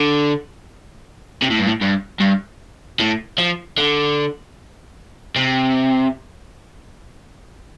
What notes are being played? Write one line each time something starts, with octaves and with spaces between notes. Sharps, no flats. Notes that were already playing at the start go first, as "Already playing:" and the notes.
Already playing: D3
C3
A2
G2
A2
G2
G2
A2
F3
D3
C3